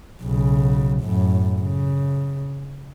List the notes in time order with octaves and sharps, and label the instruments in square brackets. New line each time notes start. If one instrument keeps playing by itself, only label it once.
[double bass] B1 C#3
F#2 A2
C#3